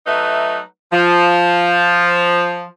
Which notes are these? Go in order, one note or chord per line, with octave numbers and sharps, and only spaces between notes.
F#3 A3 D#4 B4 E5
F3